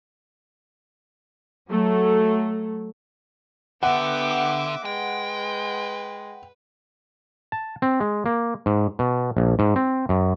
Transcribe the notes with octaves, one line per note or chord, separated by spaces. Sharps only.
F#3 A3
D3 B3 G4 E5 F#5 D6
G#3 B4 G5
A5
C4
G#3
A#3
G#2
B2
A#1
G#2
C4
F#2